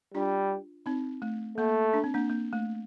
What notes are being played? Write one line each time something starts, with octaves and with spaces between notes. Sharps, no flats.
G3 D4 F4
C4 D#4
A3
A3 A#3
D4
C4
A#3 D4
A#3
A3